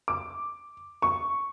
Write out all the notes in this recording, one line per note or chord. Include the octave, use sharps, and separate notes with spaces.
D6
C#6